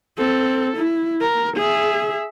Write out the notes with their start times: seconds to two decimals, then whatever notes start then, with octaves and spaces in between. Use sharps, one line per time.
0.18 C4 A4
0.77 E4
1.21 A#4
1.57 G#4 E5